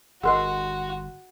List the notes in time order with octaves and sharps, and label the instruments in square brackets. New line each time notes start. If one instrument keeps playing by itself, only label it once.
[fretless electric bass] G1 [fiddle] F#4 [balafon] G#4 A#4 D#5 [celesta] F#5 C6